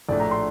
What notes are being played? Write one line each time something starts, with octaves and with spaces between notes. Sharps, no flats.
A#1 A2 A3 D4 D5
A#5
C6